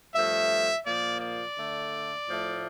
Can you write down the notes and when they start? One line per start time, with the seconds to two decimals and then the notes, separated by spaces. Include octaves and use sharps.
0.14 G2 F3 A3 E5
0.85 A#2 F3 A#3 D5
1.21 D5
1.56 D3 A3
2.27 A2 F3 A3